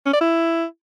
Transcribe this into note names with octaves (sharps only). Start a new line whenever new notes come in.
C#4
D5
E4